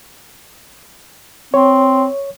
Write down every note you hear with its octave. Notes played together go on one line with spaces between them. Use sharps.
C4 C#5